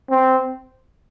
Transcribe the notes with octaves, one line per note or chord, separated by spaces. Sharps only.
C4